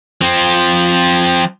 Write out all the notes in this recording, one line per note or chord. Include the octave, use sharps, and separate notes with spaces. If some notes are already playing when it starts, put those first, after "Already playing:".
F3 C4